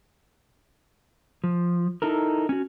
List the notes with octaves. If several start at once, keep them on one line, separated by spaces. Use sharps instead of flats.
F3
D#4 E4 A4 A#4
C#4 F#4